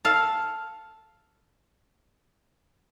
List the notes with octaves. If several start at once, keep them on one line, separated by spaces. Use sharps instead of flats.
A4 F5